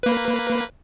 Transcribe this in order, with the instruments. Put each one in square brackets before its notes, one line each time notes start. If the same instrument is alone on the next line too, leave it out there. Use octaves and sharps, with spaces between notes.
[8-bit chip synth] A#3 B4